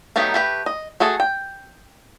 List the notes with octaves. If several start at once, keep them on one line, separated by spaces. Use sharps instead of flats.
F#3 A3 B3 D#4 G4
A3 G4 B4
D#5
A3 F#4 G#4 A4
G5